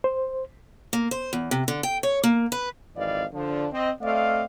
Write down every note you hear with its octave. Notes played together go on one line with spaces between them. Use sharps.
C5
A#3
C5
E2
C3
D3
G5
C#5
A#3
B4
G#1 F2 E3 D5 D#5 F5
D3 F3 D4
C4 D#5
A3 C4 D5 D#5 F5